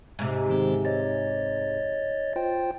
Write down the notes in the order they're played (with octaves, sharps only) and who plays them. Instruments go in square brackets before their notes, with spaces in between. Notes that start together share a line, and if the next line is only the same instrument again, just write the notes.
[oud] G#2 C3
[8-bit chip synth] D#3 G#3 C4
C#5 D#5 A6
F4 C5 G5